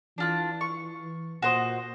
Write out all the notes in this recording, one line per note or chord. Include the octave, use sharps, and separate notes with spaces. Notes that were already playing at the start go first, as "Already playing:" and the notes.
E3 D4 F4 F#6
C#6
A#2 F#4 C5 D#5